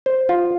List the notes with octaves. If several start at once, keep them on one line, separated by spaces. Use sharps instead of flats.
C5
F4